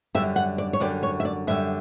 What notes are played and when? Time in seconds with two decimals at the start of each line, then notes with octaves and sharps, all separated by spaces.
0.15 F#2 D3 G3 E5
0.36 F#5
0.58 D5
0.73 C#5
0.80 F#2 D3 G3 D5
1.03 C#5
1.20 E5
1.25 D5
1.47 F#2 D3 G3 E5